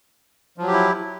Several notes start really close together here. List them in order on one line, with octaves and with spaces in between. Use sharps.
F3 F#3 G4 E4